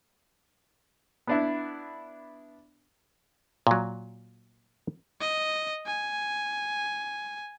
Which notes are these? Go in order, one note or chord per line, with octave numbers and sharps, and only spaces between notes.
B3 D4 E4
A#2 F#3
D#5
G#5